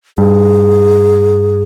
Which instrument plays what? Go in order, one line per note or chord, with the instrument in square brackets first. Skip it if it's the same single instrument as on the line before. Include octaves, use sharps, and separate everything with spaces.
[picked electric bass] G2 [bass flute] G#4